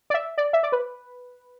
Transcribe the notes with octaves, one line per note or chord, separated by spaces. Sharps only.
D5
E5
D5
E5
D5
B4